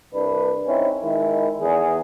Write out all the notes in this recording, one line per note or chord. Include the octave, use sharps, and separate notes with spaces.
C2 D4 B4
C4 C#4 D#4 E4
D#3 G#3 E4
E2 G#4